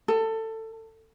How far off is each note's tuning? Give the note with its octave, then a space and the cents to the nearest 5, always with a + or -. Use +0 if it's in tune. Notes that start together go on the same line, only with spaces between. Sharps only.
A4 +20